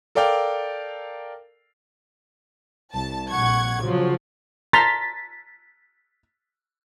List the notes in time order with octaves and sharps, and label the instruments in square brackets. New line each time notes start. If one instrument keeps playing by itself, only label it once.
[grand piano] A4 A#4 D5 F5 G5
[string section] C2 A5
A#1 F#5 C#6 G#6
C#3 F3 F#3
[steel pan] A5 A#5 C6 [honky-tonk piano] A6 B6